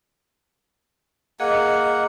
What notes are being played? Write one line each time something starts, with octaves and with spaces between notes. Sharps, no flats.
A#3 G#4 D#5 F#5